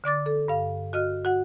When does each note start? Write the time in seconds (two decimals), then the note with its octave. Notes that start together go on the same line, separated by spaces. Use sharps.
0.04 D3 D5 D6 A6
0.26 A4
0.48 G2 F5
0.93 F#4 D#5 F6
1.25 F#4 F#5